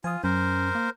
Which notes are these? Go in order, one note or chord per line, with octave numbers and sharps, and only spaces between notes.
F3 F4 G#5 D#6
F#2 C#4 A#4 C5
A#3